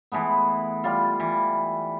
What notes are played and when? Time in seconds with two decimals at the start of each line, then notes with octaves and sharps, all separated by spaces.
0.12 E3 G#3 A3 B3
0.84 G3 F4
1.20 E3